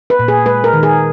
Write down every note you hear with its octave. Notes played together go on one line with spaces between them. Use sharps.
B4
A#2
G#4
G#3 B4
A#4
D#3
G#4